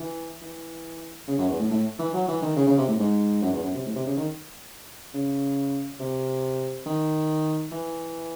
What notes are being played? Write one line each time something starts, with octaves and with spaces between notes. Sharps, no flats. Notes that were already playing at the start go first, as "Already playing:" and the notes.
Already playing: E3
E3
C#3
F#2
E2
A2
A2
E3
F#3
E3
D#3
C#3
C#3
C3
A2
G#2
F#2
E2
F#2
C3
A2
C3
C#3
D#3
C#3
C3
D#3
E3